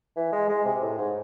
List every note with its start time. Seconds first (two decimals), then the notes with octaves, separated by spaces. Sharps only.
0.17 E3
0.33 G#3
0.49 G#3
0.65 C3
0.82 A2
0.98 G#2